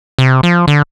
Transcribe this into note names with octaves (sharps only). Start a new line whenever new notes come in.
C3
F3
D3